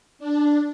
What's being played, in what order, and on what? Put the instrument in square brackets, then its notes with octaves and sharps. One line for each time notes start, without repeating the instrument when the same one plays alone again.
[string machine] D4